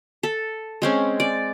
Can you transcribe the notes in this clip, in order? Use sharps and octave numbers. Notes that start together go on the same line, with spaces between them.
A4
G#3 C4 C#4
D5